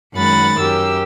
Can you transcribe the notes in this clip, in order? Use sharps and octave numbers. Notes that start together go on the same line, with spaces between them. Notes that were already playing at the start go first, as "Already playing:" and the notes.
F#2 D#3 G#3 F#5 B5 A6
F#2 G4 A#4 E6